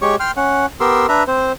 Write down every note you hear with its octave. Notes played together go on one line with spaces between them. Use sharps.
G#3 G4 C#5 C#6
G5 C6 F6
C#4 F#5
B3 G4 A#4 C6 E6
D4 B4 E5 A#5
C4 C5